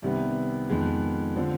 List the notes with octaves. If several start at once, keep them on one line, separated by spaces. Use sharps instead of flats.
C2 C3 D#3 B3
F2 D#3 G#3 B3
D3 F3 C4